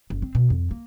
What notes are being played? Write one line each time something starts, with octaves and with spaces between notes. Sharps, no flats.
F#1
C4
B2
F2
A#3